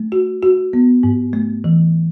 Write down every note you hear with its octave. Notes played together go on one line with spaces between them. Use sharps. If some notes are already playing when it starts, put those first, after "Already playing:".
Already playing: A3
F#4
F#4
B3
G#2
A3
E3